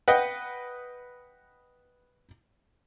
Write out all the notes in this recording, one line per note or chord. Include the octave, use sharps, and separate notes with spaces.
B4 D#5 F#5 G5